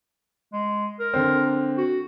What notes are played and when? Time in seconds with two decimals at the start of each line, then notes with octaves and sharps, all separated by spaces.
0.53 G#3
1.00 A#4
1.14 D3 C4
1.77 F#4